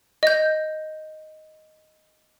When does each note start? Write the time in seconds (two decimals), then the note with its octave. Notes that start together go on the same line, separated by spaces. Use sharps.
0.23 D#5 G6